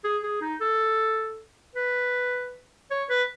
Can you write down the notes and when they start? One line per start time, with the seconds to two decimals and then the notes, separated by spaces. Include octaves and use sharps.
0.04 G#4
0.23 G#4
0.41 D#4
0.61 A4
1.76 B4
2.91 C#5
3.09 B4